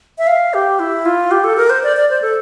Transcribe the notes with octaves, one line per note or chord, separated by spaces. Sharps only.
E5
F5
G4
E4
F4
G4
A4
A#4
C5
D5
D5
C5
A4